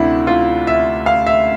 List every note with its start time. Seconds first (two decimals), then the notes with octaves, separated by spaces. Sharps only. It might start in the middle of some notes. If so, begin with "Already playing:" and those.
Already playing: D2 C3 D4 E4
0.27 F4
0.67 E5
1.06 F5
1.27 E5